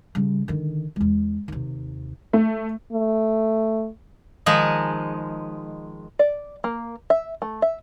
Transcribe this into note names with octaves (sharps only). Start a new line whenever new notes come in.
C#3 G3
D3 D#3
E2 G#3
D#2 C3
A3
A3
D#3 F3 G#3 D#4
D5
A#3
E5
A3
E5